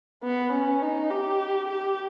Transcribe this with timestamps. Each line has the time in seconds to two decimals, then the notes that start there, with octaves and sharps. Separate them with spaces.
0.24 B3
0.52 C#4
0.82 D#4
1.10 G4
1.68 G4